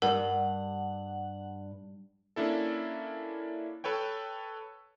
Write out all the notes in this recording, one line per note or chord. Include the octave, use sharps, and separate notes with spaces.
G2 G3 A#4 F#5
A#3 C#4 D4 E4 A4
A4 B4 C#5 G5